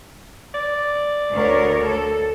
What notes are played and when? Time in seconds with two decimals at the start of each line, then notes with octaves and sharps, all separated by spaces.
0.54 D5
1.32 D2 A#4 C#5
1.83 A4